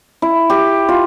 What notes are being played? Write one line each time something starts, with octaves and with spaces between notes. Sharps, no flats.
E4
G4
F4